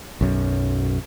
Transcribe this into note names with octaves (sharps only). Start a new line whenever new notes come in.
B1 F#2